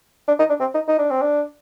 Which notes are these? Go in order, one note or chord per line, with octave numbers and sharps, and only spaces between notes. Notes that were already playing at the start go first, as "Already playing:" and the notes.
D4
D#4
D4
C4
D#4
D#4
D4
C4
D4